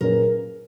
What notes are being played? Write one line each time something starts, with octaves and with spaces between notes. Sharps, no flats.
A#2 F#3 C#4 G#4 A#4 B4